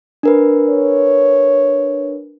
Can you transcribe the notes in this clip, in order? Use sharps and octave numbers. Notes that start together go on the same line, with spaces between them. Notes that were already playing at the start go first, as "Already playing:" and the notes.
D4 A#4 B4
C#5